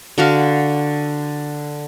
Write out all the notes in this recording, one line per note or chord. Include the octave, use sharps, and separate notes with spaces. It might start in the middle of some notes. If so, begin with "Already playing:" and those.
D3 F#4 F5